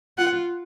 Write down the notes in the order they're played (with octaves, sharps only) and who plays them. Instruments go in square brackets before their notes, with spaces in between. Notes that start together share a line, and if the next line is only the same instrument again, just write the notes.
[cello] F4 [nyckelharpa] F#5